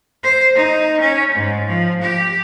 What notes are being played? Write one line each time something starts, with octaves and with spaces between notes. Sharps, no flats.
C5
D#4
C#4
G#2
F3
G4